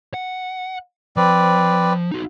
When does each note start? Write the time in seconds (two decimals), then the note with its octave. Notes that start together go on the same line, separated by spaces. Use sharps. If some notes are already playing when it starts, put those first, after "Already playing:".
0.14 F#5
1.17 F3 C4 B4 D5
2.12 D#4 F#4